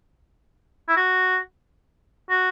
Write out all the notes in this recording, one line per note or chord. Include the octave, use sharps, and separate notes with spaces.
E4
F#4
F#4